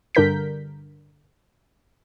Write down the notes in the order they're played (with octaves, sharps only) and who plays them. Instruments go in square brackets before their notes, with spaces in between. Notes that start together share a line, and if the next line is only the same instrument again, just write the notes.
[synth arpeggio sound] G2 D3 A#4 G6 B6